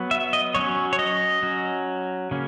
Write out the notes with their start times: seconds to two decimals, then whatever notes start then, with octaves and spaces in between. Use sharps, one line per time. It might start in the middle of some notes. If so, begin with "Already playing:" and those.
Already playing: F#3 B3
0.11 E5
0.33 D#5
0.55 F#3 C#4 C#5
0.93 C#5
0.99 D#5
1.43 F#3 C#4
2.31 C#3 F#3 A#3 C#4